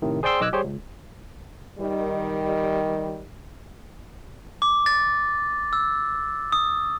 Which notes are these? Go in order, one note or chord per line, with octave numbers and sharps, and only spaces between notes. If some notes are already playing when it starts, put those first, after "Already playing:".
A2 C3 D#3
G#4 C5 D5 G5 C6 E6
B1 D#5 D6 E6 F#6 G#6
G3 G4 G#4 C5 C#5
C#2
D#3 G3
D6
A6
E6
D#6